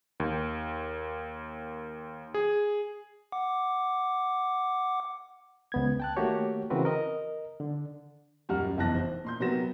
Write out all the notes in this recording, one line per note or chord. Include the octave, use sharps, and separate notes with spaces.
D#2
G#4
F#5 D6
C#2 B3 G#6
G5 A5 F#6
D#3 A3 A#3 F#4 G4 C#5
C#3 E3 C4 F#4 A#4 B4
A#4 D#5
D3
D#1 F#2 G3 F#5 F6
F1 B1 E3 A5 F#6 A#6
C5
A#2 C6 G6
C3 F#3 B3 A#4 A#6 E7